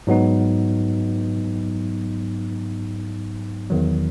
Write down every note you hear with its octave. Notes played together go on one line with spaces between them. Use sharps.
G#2 F#3 B3 D#4
E2 D#3 F#3